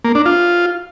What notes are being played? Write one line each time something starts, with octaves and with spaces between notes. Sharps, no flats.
A#3
D4
F4